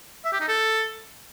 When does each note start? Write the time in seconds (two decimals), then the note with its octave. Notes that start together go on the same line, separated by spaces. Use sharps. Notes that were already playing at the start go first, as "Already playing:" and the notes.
0.25 E5
0.33 G4
0.40 D#4
0.48 A4